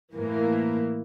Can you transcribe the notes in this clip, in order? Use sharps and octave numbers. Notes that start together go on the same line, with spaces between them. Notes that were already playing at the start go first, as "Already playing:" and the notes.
A2 E3 A#3